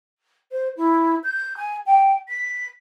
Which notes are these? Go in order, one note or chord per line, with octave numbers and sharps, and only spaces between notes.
C5
E4
G6
G#5
G5
B6